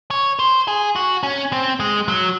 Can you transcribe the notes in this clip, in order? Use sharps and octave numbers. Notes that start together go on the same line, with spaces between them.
C#5
C5
G#4
F#4
C#4
C4
G#3
F#3